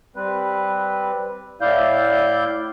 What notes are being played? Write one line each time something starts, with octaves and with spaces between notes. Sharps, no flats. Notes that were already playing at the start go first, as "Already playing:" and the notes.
G3 C4 B4
A2 E4 D5 F5 G6